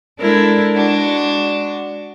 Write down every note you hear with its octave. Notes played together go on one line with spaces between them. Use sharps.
G#3 D4 E4 A4 A#4
G#3 D4 F#4